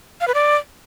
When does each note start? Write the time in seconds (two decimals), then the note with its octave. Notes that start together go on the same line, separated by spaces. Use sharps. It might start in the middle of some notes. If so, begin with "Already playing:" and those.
0.21 F5
0.27 B4
0.34 D5